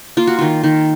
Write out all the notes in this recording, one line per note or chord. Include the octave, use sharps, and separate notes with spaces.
A#3 F4
F#4
D#3 F4
D#3